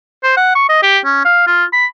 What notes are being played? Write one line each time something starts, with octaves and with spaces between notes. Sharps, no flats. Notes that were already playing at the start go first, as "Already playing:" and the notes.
C5
F#5
C#6
D#5
G4
C#4
F5
F4
B5